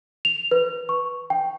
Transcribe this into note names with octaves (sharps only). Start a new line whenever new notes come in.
F7
B4
C#6
G5